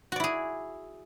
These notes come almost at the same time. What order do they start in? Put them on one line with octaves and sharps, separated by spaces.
F#4 D5 E4 G#4